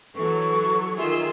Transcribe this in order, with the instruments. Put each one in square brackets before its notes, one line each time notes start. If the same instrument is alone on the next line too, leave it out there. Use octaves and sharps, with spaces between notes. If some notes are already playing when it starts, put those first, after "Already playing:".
[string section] E3 [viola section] F#3 A4 [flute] C#6
[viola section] D#3 G#4 [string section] F4 C6 E6 [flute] E5